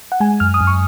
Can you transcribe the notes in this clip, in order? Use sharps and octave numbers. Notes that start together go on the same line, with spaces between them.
F#5
G#3 G#5
F#2 F6
D#6
F#2
C#6